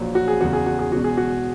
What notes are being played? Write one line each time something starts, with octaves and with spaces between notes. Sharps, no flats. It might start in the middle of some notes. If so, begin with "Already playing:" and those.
Already playing: A#1 A#2 F#3
F#4
G#4
E2 C#3 F#3 F#4
G#4
F#4
G#4
E1 E2 B2 F#4
G#4
F#4